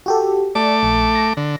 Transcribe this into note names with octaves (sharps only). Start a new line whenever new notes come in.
F#4 G4 A4
A3 D5 D6
A#1
A#6
D3